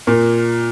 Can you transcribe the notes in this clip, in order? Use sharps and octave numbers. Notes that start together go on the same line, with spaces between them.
A#2 A#3